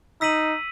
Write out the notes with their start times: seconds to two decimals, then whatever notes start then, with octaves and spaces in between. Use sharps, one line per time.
0.21 D#4 E6 B6 D#7 F#7